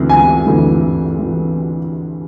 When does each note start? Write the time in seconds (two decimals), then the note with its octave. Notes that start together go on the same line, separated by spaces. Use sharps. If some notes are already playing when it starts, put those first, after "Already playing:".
Already playing: D2 C3 E3
0.09 G#5
0.46 D2 C3 E3
1.19 C3 E3